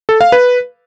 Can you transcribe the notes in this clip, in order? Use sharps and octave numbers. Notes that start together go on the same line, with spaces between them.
A4
F5
B4